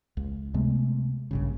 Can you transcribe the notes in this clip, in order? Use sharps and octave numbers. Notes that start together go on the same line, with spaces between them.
C#2
C3 G#3 A3 B3
A#1 G2 C#3